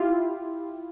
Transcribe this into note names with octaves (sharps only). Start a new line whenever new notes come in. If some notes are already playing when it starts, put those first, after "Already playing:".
Already playing: E4 F4 G4